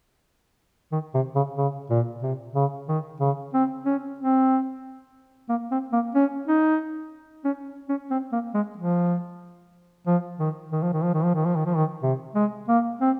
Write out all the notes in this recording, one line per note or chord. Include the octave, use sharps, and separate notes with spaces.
D#3
C3
C#3
C#3
A#2
C3
C#3
D#3
C#3
C4
C#4
C4
A#3
C4
A#3
C#4
D#4
C#4
C#4
C4
A#3
G#3
F3
F3
D#3
D#3
F3
D#3
F3
D#3
F3
D#3
F3
D#3
F3
D#3
C3
G#3
A#3
C4